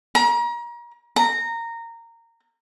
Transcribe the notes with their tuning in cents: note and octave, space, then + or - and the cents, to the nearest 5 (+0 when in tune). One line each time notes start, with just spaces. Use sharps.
A#5 +35
A#5 -15